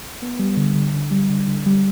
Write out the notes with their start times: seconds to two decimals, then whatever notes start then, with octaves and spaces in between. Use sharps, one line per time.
0.22 B3
0.39 G3
0.57 D3
0.75 D3
0.93 D3
1.11 G3
1.30 D3
1.47 D3
1.66 G3